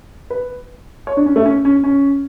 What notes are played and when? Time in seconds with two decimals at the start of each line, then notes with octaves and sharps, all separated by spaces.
0.30 B4
1.07 C#5
1.17 D4
1.26 C#4
1.36 A3
1.45 C#4
1.65 C#4
1.84 C#4